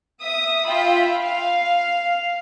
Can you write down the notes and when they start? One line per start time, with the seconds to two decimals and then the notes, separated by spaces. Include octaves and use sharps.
0.22 E5 D#6
0.67 F4 E5 G5 B5
1.17 F5